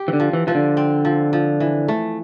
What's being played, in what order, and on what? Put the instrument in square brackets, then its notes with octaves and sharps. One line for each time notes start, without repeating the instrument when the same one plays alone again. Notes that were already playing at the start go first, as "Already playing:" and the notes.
Already playing: [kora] G4
[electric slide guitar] E3
D3
[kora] F3
[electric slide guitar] E3
[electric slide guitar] E3 [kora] F3
[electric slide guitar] D3
[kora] C4
F3
F3
E3
A3